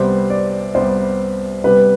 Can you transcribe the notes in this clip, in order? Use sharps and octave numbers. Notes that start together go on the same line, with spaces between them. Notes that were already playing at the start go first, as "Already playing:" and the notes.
Already playing: C2 C3 G3 B3 C5
D5
C2 C3 G3 B3 C5
C2 C3 G3 B3 B4